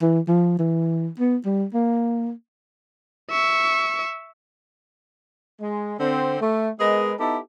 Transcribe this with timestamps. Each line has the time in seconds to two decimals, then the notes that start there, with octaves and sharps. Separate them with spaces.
0.02 E3
0.28 F3
0.59 E3
1.20 B3
1.45 G3
1.74 A#3
3.30 E5 C#6
5.61 G#3
6.00 D3 C4
6.40 A3
6.79 G#3 B3 G#4 A#4 B4 D#5
7.19 B3 D#4 E4 G4 A4